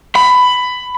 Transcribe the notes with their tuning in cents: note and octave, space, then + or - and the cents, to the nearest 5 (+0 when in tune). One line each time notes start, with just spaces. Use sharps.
B5 +15